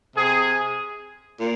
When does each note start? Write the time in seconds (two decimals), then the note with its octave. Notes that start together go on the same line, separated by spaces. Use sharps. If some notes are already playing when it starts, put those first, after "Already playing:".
0.16 C3 G#4
1.40 A#2